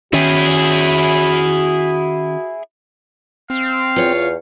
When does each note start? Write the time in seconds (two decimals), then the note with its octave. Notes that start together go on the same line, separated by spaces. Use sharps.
0.13 D#3 C#4 E4 F#4 G#4
3.50 C4 F5
3.96 E2 F4 C#5